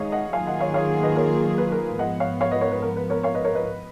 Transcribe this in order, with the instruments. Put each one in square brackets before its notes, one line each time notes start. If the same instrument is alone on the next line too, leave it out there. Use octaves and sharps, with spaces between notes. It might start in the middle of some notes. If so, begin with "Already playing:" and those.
Already playing: [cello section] D#3 G#3 D#4 G#4 [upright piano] C#5 D#5 F5
[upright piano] D#5 F#5
[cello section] D#3 F#3 A#3 F4 G#4 [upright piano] F5 G#5
[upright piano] D#5 F#5
C#5 F5
C#5 F5
B4 D#5
A#4 C#5
B4
A#4
[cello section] G#2 F3 B3 [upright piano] D#5 F#5
[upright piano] C#5 F5
C#5 F5
B4 D#5
A#4 C#5
B4
A#4
B4
A#4 C#5
C#5 F5
B4 D#5
A#4 C#5
B4 D#5